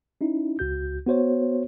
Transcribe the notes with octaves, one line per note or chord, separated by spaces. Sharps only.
C#4 D#4 E4
C#2 F#4 G6
B3 F#4 C5 C#5